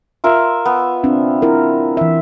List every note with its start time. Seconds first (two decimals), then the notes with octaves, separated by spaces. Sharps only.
0.24 F4 A#4 E5
0.65 B3
1.04 C4 D4
1.42 E4 A#4
1.97 E3 E5